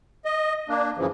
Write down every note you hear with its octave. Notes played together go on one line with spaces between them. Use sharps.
D#5
A#3 D4
F#2 C#3 E3 F3